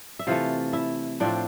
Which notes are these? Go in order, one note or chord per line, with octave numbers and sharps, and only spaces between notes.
E5
C3 E3 A3 F4 F5
E4 E5
A2 F3 C4 D4 D5